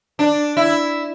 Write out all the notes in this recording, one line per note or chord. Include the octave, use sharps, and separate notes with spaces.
D4
E4